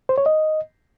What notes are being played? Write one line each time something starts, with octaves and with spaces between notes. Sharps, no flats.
C5
C#5
D#5